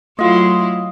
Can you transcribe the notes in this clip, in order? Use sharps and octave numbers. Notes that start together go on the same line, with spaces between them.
F#3 A3 E4 F4 D#5 F5 C6